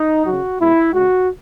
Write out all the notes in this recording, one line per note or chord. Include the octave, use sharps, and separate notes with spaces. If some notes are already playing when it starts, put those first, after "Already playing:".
Already playing: D#4
C#3 F#3 F#4
B2 G#3 E4
C#3 G#3 F#4